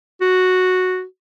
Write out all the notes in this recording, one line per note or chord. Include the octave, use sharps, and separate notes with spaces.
F#4